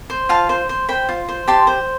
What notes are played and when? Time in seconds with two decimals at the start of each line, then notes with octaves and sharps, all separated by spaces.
0.10 C5
0.29 F4 F5 A5
0.49 C5
0.69 C5
0.89 C5 G5 B5
1.09 F4
1.29 C5
1.48 G4 A5 C6
1.67 C5